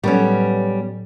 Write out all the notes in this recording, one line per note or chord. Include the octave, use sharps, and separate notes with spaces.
A2 F#3 G3 B3 C#4 A4